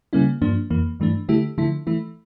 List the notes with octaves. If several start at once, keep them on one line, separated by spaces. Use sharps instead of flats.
C#3 G3 A#3 C#4 E4
G2 F3 A#3 D4
F2 E3 A#3
G2 E3 A3 D4
D3 A3 E4 G4
D3 F3 A3 E4
E3 A3 E4